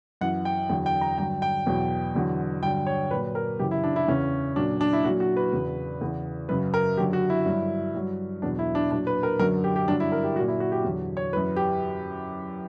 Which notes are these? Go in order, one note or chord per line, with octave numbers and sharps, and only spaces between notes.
F#2 E3 F#5
G5
E2 D3 F#3 G5
G5
A#5
G2 D3 F#3 G5
G5
E2 B2 F#3
E2 D3 F#3
G2 D3 F#3 G5
C#5
A#2 F#3 B4
A#4
F#2 C#3 E3 G4
E4
D4
E4
E2 C#3 E3 C#4
A#2 F#3 D4
D4
E4
A#2 F#3 F#4
F#4
B4
E2 C#3 F#3
E2 C#3 E3
F#2 C#3 F#3 B4
A#4
F#2 D3 F#3 G4
F#4
E4
G2 F#3
G2 F#3
E2 B2 F#3 D4
E4
D4
A#2 F#3 D4
B4
A#4
F#2 D3 F#3 A#4
G4
G4
G2 D3 F#3 D4
E4
A#4
G4
A#2 F#3 F#4
E4
F#4
G4
E2 D3 F#3
C#5
F#2 E3 B4
G4